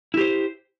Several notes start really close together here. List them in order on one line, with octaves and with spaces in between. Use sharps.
E4 G4 C5